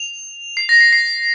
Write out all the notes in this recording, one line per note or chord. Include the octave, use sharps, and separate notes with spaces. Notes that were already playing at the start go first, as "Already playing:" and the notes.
Already playing: F7
C7
A#6
C7
C7